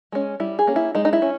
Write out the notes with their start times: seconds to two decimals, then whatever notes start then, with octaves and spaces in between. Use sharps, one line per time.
0.12 G#3 C#4
0.40 G3 E4
0.59 G#4
0.67 A#3 C#4
0.76 E4
0.95 G#3 D#4
1.05 D#4
1.13 E4
1.22 C#4